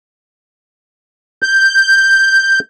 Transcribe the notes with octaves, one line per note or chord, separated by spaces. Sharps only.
G6